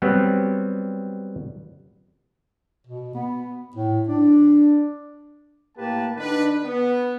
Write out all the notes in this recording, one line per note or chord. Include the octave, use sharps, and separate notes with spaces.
F#3 G3 B3 C4
B2
B3
A2
D4
A2 A#3 G4 B4 A5
D3 D4 D#4 B4
B3